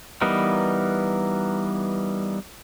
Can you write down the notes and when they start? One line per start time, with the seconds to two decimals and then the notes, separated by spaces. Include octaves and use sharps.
0.21 E3 G3 B3 D#4 A#4